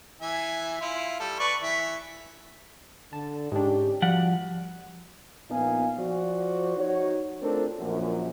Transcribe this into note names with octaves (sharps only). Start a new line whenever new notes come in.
E3 E5 G#5
E4 F4
G3 A4
B4 D5 C#6
E3 E5
D3 A5
G#2 C#4 D4 G4
F3 G3 D4 F#4 F#5
A#1 A#2 B3 D#4 F5 G#5
F3 F#4 C5 D5
D#4 F#4 C#5
A3 C4 D4 F4 A4 A#4
A#1 F#2